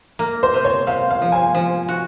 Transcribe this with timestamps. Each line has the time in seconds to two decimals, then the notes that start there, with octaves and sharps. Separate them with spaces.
0.19 A#3
0.43 C5
0.54 C3
0.65 C#5
0.87 C3 F5
1.10 F5
1.22 F3
1.32 G#5
1.55 F3
1.89 F#4